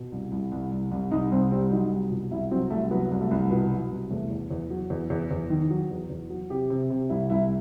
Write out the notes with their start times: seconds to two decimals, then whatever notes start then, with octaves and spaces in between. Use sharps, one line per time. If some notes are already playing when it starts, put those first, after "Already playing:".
Already playing: B2
0.12 C2
0.31 C2
0.52 C2
0.72 C2
0.91 C2
1.11 C2 D#4
1.31 C2 C4
1.51 G3 C4
1.71 F#3 D#4
1.91 C2
2.11 B2
2.31 C2 E4
2.51 F#3 C4
2.70 C2 A3
2.91 F#3 B3
3.11 C2
3.21 A3
3.31 C2
3.51 B2 B3
3.71 F#3
3.91 C2
4.10 E2 A3
4.30 E2
4.51 E2
4.70 F#3
4.90 E2
5.10 E2
5.31 E2
5.50 D#3
5.70 F#3
5.90 E2
6.10 E2
6.30 F#3
6.50 C3 G4
6.70 C3
6.90 C3
7.09 C2 E4
7.30 C2 E4